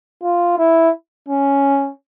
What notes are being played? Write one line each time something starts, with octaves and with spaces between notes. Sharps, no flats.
F4
E4
C#4